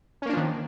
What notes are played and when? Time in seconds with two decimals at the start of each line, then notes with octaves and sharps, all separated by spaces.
0.22 C#4
0.26 A#3
0.29 D4
0.33 F3
0.37 D#3